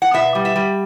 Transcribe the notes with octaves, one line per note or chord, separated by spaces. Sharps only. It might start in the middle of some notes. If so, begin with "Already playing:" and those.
F#5
B2 E5
G3
E5
G3